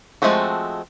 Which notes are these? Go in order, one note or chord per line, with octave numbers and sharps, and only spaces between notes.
F3 G#3 A3 C4 F#4